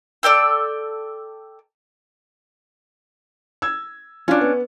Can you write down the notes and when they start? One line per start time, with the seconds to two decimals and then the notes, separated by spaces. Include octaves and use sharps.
0.23 A4 D5 G5 E6
3.62 E6 G#6
4.28 C#4 D4 F4
4.41 B3